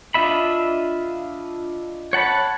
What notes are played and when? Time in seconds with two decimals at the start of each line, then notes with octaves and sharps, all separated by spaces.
0.14 D4 F4 D#5 E5 B5
2.13 C#5 F#5 A5 B5